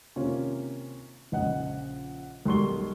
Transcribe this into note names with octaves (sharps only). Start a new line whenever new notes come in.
C3 D#3 A#3 C#4 F4
A#1 C#3 D#5 F#5
B1 G3 A#4 C6 C#6 G7